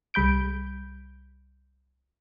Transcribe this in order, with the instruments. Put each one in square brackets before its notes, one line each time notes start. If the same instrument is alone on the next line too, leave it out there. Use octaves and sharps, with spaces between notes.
[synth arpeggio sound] C2 G3 B5 G6 D7